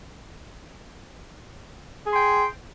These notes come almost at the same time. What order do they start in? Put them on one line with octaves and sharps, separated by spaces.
G#4 C6 G5